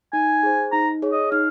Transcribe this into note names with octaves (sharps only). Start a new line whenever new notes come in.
D#4 G#5
G#4 C5
D#4 A#5
G#4 C#5
D#5
D#4 F5